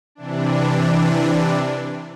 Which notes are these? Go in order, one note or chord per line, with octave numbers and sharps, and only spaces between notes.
C3 E3 D4